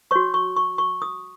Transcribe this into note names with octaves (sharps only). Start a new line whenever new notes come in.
F#4 C#5 C#6
C#6
C#6
C#6
D#6